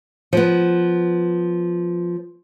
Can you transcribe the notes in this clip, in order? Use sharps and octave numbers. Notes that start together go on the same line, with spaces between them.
F3 B3